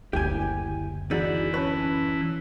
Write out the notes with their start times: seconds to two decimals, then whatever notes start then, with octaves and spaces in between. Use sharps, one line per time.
0.13 F#1 D2 E4 G4 G#5
1.11 E3 D#4 F#4 G#4 D5
1.54 C#4 B4 A5 C#6